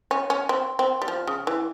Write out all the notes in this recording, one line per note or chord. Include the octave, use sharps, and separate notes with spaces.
C#4
C#4
C4
C4
G3
F3
C#3
E3